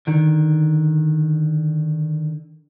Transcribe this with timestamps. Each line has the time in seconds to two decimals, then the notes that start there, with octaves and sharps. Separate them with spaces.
0.07 D3 D#3